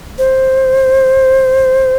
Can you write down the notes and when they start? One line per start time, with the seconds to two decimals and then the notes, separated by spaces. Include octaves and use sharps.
0.18 C5